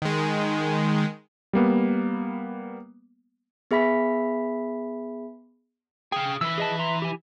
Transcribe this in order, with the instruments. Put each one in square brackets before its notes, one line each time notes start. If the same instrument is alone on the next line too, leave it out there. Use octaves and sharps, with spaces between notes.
[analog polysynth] D#3 G#3
[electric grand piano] G3 A#3 B3
[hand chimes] B3 G#4 E5 B5 B6
[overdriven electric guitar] G#4 F5 [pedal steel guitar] G5
[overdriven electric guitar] E3 B4 [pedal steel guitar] E6
[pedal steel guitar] G#4 D#5 A5
E5 A#5 C6
G4 G#5